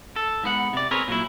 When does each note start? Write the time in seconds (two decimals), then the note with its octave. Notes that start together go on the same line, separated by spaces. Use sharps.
0.16 A4
0.43 G#2 B3 F#5
0.73 C3 D5
0.91 C4 G#4 A#4 B4 C#5
1.08 A#2 F#3 E4